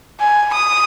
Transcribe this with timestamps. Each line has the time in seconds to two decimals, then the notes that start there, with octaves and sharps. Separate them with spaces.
0.21 G#5
0.54 D#6